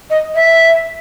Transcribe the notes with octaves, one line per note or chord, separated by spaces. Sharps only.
D#5
E5